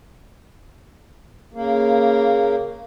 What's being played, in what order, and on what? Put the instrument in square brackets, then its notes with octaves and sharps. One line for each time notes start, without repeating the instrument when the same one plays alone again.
[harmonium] C#3 A#3